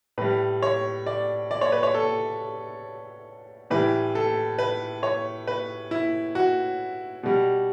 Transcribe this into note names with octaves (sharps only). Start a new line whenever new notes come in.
A2 G3 B4
C#5
D5
D5
C#5
B4
C#5
A4
A2 E3 G3 B4
A4
B4
C#5
B4
E4
F#4
B2 G3